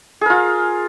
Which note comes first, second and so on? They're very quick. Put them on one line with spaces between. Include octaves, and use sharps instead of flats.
G#4 A#4 F4